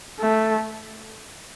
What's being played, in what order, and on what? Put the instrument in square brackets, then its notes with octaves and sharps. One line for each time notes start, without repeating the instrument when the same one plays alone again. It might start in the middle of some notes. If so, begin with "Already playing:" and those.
[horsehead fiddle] A3